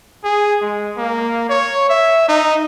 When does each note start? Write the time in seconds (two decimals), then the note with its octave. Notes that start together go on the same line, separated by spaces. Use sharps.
0.24 G#4
0.61 G#3
0.97 A#3
1.49 C#5
1.89 E5
2.28 D#4